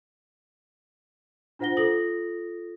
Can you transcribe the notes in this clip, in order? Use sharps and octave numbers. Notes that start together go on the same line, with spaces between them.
D4 F4 C5 F#5 A#6 G7
F4 A4 D#6 A#6 F#7